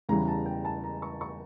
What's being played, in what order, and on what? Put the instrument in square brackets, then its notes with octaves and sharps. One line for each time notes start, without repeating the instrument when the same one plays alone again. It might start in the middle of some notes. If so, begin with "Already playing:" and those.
[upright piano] E2 C#3 E3 G3 A#5
A5
G5
A5
A#5
C#6
C#6